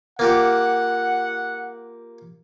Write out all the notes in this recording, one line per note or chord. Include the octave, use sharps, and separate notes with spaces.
A#3 F4 G4 F#5